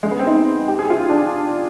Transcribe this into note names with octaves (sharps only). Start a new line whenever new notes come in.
G#3
B3
C4
D#4
G4
G#4
F4
D4